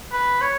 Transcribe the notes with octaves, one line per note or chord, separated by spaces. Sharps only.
B4
C#5